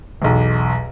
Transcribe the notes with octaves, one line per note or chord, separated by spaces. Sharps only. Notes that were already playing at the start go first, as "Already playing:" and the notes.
B1 E2